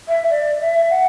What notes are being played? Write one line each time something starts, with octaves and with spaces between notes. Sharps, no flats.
E5
D5
E5
F#5